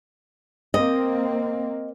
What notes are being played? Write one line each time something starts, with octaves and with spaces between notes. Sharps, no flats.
A#3 C4 D#5